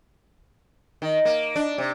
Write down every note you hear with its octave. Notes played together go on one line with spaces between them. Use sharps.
D#3
A#3
D4
C3